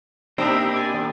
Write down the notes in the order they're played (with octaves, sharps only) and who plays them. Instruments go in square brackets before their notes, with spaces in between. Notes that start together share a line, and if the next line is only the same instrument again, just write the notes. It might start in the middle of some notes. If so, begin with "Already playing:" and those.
[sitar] B2 C4 D4 [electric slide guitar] A#3 G4 [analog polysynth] D#4 E5 A#5
[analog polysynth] D5 G#5
D#3